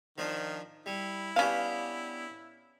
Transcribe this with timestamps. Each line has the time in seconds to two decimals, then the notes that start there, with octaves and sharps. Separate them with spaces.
0.18 D#3 F3 D4
0.86 G3 E4
1.36 B3 C#4 D4 G4 F5